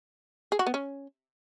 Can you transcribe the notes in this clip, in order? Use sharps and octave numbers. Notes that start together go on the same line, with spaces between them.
G#4
F#4
B3
C#4